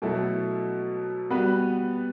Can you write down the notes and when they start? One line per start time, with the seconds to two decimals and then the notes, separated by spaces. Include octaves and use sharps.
0.02 B2 F#3 A3 E4 A4
1.30 G3 B3 F#4 B4